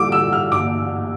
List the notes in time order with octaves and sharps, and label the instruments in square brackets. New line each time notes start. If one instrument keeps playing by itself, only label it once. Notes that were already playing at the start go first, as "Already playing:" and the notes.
Already playing: [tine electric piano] E3 G3 A#3 E4 A4 [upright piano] D6
[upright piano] E6
F6
[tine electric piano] G2 E3 A#3 [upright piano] D6